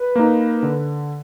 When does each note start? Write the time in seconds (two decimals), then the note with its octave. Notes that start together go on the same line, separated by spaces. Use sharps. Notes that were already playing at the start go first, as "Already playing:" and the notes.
Already playing: B4
0.16 A#3 D#4
0.63 D3